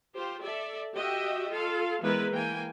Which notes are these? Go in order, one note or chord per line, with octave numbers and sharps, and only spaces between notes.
F4 G4 C5
A4 D5 E5
F#4 G4 D#5 E5 G5
F4 A4 F5
E3 G#3 B3 E4 A#4 B4
E3 A#3 G5 G#5